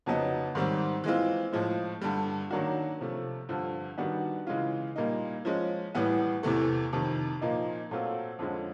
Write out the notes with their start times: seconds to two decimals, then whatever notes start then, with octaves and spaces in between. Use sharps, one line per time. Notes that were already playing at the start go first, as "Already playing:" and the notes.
0.06 F2 C#3 F#3 B3 D#4
0.55 G#2 D#3 G3 C4
1.04 E3 G#3 C4 F4
1.52 A2 F3 G#3
2.01 G2 D3 G3
2.50 D#3 F#3 A#3 D4 F#4
3.01 C3 F3 A3
3.49 G2 D3 F3
3.98 D#3 G3 B3 D4 F#4
4.47 C#3 E3 G#3 C#4 F4
4.96 A#2 G3 A#3 D#4
5.45 F3 G#3 C#4
5.95 A2 E3 G3 B3
6.43 E2 C3 E3 A3
6.93 F2 C3 D#3
7.41 A#2 F3 A#3 D#4
7.91 A#2 F#3 A3 C4 F4
8.39 F2 D3 F3 G#3 C#4